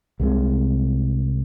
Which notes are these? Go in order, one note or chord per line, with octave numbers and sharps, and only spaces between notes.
C2 C3 G#3